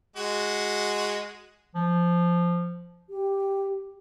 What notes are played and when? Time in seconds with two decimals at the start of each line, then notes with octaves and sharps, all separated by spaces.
0.16 G#3 F#4
1.75 F3
3.10 G4